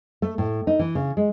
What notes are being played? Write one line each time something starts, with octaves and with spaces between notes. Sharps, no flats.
A3
A2
D#4
E3
C#3
G#3